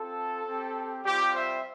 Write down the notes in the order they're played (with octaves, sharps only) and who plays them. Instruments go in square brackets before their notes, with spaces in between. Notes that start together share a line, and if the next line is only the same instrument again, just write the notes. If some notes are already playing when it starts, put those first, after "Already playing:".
Already playing: [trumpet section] C4 F4 A4
C4 G4
G3 C4 F4 G4
C5 E5